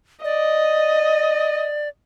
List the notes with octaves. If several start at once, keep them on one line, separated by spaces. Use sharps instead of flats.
D5 D#5